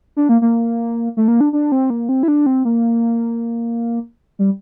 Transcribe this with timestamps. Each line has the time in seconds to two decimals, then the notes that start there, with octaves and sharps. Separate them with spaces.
0.17 D4
0.29 A#3
0.42 A#3
1.17 A3
1.28 A#3
1.41 D4
1.53 D4
1.72 C4
1.90 A#3
2.09 C4
2.23 E4
2.28 D4
2.46 C4
2.65 A#3
4.39 G3